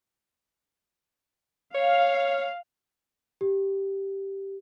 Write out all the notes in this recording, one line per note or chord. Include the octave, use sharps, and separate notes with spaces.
C#5 F5
G4